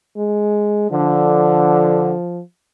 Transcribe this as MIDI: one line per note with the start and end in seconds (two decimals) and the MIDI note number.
0.17 0.87 56
0.90 2.11 50
0.90 2.41 53